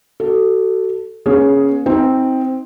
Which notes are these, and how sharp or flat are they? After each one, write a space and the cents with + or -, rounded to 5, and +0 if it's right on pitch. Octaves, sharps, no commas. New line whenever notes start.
F#4 +35 A4 +10
A#3 +45 C#4 +0 G#4 +5
C4 +0 D#4 +25